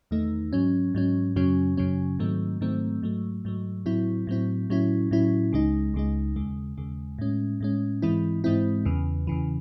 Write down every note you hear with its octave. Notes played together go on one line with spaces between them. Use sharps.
E2 D#3 A3 D#4
G#2 F#3 C#4
G#2 F#3 C#4
F#2 C#3 F#3 C#4
F#2 C#3 F#3 C#4
G#2 D#3 F#3 A3 C4
G#2 D#3 F#3 A3 C4
G#2 F#3 A3
G#2 F#3 A3
A2 F#3 C4 E4
A2 F#3 C4 E4
A2 F#3 C#4 E4
A2 F#3 C#4 E4
C#2 C#3 G#3 D#4
C#2 C#3 G#3 D#4
D#2 C#3 G#3
D#2 C#3 G#3
A2 G#3 C#4
A2 G#3 C#4
G#2 E3 G#3 C4 E4
G#2 E3 G#3 C4 E4
E2 C#3 E3
E2 C#3 E3